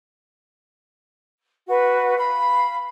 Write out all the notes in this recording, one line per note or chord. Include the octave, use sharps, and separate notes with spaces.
F#4 B4
F5 B5